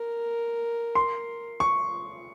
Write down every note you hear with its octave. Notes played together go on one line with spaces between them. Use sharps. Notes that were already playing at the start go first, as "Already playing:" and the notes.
Already playing: A#4
C6
C#6